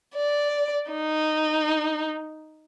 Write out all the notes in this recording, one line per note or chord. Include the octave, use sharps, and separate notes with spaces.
D5
D#4